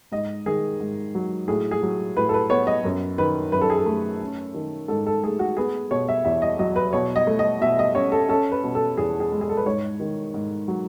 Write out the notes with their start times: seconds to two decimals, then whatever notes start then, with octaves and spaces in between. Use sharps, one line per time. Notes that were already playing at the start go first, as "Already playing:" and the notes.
0.12 G#2 D#5
0.46 D#3 G#4
0.80 G#2
1.15 F#3
1.48 A2 G#4
1.71 G#4
1.83 F#3
2.17 A2 B4
2.29 A4
2.34 B4
2.50 B3 C#5
2.67 D#5
2.84 F#2
3.18 D#3 B4
3.52 F#2 B4
3.61 A4
3.70 G#4
3.77 A4
3.86 A3
4.21 C#4
4.54 D#3
4.88 G#2 A4
5.06 A4
5.24 A3 G#4
5.39 F#4
5.57 B3 G#4
5.91 B2 C#5
6.09 E5
6.25 E2 E5
6.42 D#5
6.59 F#3 D#5
6.76 B4
6.93 B2 C#5
7.16 D#5
7.27 A3
7.39 D#5
7.61 B2 E5
7.79 D#5
7.95 C#4 C#5
8.12 A4
8.29 C#4 A4
8.52 B4
8.64 B2
8.75 A4
8.97 E2 G#4
9.20 G#4
9.32 G#3
9.41 G#4
9.49 A4
9.57 B4
9.66 G#2 C#5
10.00 D#3
10.34 G#2
10.68 F#3